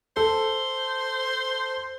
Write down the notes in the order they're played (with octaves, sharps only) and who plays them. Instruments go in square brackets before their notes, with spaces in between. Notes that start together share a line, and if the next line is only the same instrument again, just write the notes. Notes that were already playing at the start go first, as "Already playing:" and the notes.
[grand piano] A4 [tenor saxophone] C5